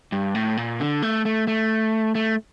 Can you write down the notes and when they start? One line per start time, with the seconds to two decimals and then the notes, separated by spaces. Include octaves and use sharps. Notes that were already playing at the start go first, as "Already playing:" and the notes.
0.12 G2
0.35 A2
0.57 A#2
0.80 D3
1.02 A3
1.25 A3
1.47 A3
2.15 A3